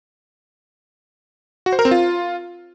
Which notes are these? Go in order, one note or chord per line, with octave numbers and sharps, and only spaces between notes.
F#4
C5
A#4
C4
F4